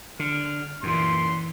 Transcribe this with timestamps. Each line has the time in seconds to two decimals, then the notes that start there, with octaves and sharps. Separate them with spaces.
0.19 D3 F6
0.83 F#2 A#2 E3 C6